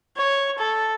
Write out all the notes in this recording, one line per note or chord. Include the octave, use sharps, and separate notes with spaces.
C#5
A4